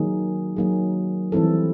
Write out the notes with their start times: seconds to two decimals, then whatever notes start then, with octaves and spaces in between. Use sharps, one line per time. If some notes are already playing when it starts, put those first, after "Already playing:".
Already playing: D#3 F#3 A#3 D#4 G#4
0.57 D#3 F#3 A#3 D#4 G#4
1.32 E3 G3 C4 E4 A4